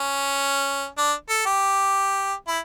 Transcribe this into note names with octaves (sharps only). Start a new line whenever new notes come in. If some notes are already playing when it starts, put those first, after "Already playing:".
Already playing: C#4
D4
A4
G4
E4